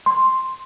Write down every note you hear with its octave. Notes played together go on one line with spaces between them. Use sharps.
C6